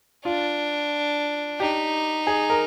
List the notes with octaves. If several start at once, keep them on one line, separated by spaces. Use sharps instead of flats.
D4 F4
D#4 G4
G#4
A#4